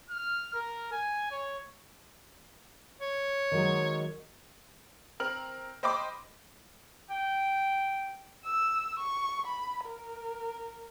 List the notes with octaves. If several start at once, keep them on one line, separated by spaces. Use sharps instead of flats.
F6
A#4
G#5
C#5
C#5
D#3 F#3 G#3
C4 A#4 F6 F#7
C5 D#5 G5 B5 C6 D6
G5
E6
C#6
B5
A#4